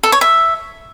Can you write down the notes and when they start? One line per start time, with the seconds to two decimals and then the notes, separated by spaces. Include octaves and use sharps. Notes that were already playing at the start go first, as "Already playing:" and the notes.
0.03 A4
0.12 C#5
0.21 E5